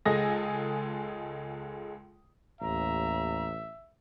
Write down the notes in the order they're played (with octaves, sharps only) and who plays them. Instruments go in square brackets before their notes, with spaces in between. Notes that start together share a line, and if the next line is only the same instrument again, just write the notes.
[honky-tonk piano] C#2 G#3 A4 G#5 D#6 A#6
[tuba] A1 [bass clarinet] D#2 [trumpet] E5 [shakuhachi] A#5